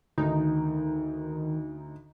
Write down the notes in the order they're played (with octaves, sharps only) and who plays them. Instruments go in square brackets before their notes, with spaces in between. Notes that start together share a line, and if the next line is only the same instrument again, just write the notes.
[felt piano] D2 [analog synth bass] D#3 [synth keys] D#4